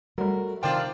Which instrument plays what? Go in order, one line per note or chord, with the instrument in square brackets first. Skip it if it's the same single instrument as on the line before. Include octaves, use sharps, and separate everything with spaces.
[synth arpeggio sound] F#3 G3 [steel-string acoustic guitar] A3 F#4 A#4
[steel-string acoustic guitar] C3 D#3 C4 [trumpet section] D4 F4 D5 [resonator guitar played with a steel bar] C5 G5